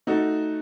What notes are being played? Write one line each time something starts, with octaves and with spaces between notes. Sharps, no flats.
A3 D#4 F#4 A4